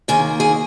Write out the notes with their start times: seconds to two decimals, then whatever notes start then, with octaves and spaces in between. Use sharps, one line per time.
0.08 D#2 D#3 A#3 G#4
0.40 G#4